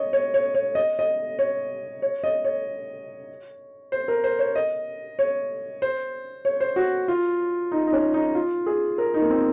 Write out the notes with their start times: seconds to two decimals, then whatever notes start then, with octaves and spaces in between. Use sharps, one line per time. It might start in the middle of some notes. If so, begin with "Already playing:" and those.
Already playing: C#5 D#5
0.13 C#5
0.34 C#5
0.54 C#5
0.75 D#5
0.99 D#5
1.39 C#5
2.02 C#5
2.24 D#5
2.44 C#5
3.92 C5
4.08 A#4
4.24 C5
4.39 C#5
4.56 D#5
5.19 C#5
5.82 C5
6.45 C#5
6.60 C5
6.76 F#4
7.08 F4
7.72 D#4
7.87 D#4
7.93 C#4
8.14 D#4
8.35 F4
8.66 G#4
8.98 A#4
9.14 D#4
9.22 A#3
9.30 C4